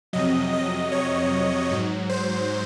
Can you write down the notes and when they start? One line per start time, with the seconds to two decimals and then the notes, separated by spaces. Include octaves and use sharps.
0.13 F2 C3 F#3 D#5
0.53 D#5
0.92 C#5
1.71 G#2 F#3
2.09 C5